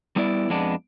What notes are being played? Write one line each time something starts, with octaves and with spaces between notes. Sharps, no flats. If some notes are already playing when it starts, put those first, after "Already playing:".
G3 B3 E4 D5
F2 G#3 B3 D4